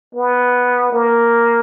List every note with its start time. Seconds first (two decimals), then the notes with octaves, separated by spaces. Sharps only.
0.15 B3
0.93 A#3